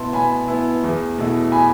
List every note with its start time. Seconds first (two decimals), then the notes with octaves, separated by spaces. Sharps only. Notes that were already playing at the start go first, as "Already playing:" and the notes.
Already playing: B2 B3 E4 A5 C6
0.13 B2 G#5 B5
0.48 B3 E4
0.84 E2
1.18 B2 A3 E4
1.52 G#5 B5